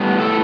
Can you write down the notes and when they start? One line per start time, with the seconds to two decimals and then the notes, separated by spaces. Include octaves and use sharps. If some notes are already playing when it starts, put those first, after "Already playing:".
Already playing: A2 G3 B3
0.20 A4